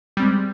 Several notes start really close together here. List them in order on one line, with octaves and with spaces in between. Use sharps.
G3 C4 G#3